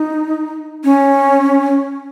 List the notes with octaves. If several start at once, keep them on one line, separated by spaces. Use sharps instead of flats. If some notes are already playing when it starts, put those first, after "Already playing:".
Already playing: D#4
C#4